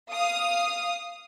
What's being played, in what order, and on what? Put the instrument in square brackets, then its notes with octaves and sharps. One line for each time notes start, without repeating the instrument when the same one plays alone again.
[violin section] F5 D#6